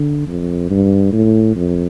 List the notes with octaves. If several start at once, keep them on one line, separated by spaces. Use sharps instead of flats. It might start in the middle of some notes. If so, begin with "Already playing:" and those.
Already playing: D3
F2
G2
A2
F2